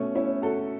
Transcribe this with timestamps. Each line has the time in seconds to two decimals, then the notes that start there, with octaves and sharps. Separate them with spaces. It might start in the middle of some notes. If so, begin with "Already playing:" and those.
Already playing: B2 A3 C#4
0.15 C#4 E4
0.42 F#4 A4